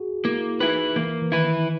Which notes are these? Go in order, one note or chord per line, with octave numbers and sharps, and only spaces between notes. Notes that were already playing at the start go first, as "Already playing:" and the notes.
Already playing: F#4 G#4
A#3 E4
D#4 E4 B4
E3 A#3
E3
D#3 E4 B4